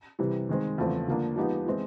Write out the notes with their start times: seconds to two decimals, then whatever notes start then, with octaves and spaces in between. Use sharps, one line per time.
0.19 C3 E3 G3
0.49 D#3 G#3 C4
0.78 E2 C#3 F3 A3 C4
1.07 D3 F3 A#3 D4
1.36 F3 G#3 B3 D#4 G4
1.66 E3 G#3 C4 E4